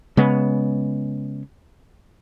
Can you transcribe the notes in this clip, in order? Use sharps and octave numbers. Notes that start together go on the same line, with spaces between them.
C#3 G#3 B3